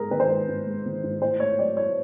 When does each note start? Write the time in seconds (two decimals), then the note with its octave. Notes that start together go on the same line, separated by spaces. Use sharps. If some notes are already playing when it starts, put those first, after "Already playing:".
Already playing: G#2 G#3 G#4 A#4
0.11 D#3 B4
0.20 C5
0.28 G#2 B4
0.48 G#2
0.66 G#3
0.86 D#3
1.04 G#2
1.22 A2 C5
1.40 A3 C#5
1.59 F#3 D5
1.77 A2 C#5